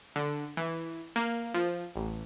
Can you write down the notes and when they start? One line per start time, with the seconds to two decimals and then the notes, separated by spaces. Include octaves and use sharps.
0.16 D3
0.57 E3
1.16 A#3
1.54 F3
1.96 A1